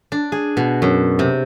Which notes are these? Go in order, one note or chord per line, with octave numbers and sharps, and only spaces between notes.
D4
G#4
B2
F#2
C3